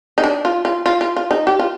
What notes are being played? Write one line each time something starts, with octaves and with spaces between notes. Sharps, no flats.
D#4
D4
F4
F4
F4
F4
F4
D#4
G4
F4